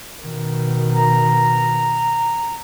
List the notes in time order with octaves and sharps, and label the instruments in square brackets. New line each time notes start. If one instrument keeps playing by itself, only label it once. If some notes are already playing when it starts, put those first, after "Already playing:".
[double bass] B2 D#3
[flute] A#5